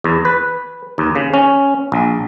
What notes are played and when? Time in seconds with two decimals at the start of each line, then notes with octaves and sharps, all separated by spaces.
0.04 E2
0.25 B4
0.98 D#2
1.15 C#3
1.34 C#4
1.92 A#1